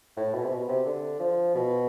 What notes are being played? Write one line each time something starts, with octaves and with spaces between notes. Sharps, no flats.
A2
B2
C3
B2
C3
D3
F3
B2